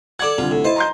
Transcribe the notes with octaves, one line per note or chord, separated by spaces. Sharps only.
A4 D5 F#5 D6 G#6
C2 D3 G3 F4
A2
E4 C5 D#5 A5
A#5 C6 G6